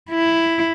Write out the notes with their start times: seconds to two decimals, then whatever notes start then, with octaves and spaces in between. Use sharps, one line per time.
0.12 E4